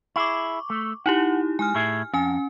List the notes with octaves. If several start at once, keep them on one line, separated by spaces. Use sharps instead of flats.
E4 G#4 C#6 D6
A3
D#4 E4 G4 F#5
G#3 G#5 F6
A2 G#4 E5
F2 C#4 G#5